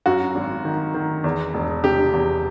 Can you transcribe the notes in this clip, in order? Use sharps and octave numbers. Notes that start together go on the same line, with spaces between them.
F#2 F#4
G#1
D#3
D#3
E2
E1
C3 G4
E2